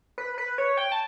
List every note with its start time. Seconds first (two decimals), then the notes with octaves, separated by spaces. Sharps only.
0.18 B4
0.38 B4
0.58 C#5
0.77 G5
0.92 A5